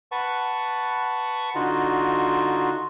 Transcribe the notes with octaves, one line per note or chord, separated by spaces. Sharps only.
B4 F#5 A5 C#6
D3 D#4 F4 F#4